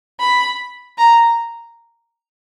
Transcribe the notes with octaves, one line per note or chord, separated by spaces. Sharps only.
B5
A#5